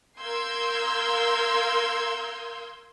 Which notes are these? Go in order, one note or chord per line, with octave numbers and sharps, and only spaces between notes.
A#4 F5 C6 E6 G6 G#6